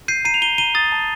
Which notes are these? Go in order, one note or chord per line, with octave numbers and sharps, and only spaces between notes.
G6 C7 D#7
A#5 C7 D#7
F7
A#5 D#7 G7
A#5 D#7 G7
D#6 A6
A5